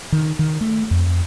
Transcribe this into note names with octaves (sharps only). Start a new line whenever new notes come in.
D#3
D#3
A3
F2